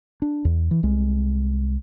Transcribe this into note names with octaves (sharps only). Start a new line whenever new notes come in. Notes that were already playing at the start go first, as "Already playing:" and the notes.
D4
E2
E3
C2 G#3